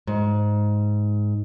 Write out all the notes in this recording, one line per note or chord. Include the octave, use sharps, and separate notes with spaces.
G#2